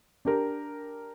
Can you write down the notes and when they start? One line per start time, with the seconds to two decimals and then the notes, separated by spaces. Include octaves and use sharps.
0.25 D4 G4 A#4